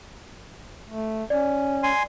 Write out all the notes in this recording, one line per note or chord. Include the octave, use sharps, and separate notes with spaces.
A3
C#4 D5
G#5 C6